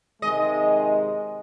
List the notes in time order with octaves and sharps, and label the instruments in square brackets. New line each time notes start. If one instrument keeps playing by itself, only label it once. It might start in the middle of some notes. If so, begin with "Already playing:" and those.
[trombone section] C3 D#3 G#3 [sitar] D#5